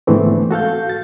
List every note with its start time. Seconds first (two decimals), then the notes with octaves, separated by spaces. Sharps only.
0.07 G#2 D3 E3 A3 B3 C4
0.51 F#4 A4 F5 G6
0.89 A6